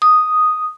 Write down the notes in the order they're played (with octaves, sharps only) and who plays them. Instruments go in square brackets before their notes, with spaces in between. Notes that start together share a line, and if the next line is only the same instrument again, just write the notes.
[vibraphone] D#6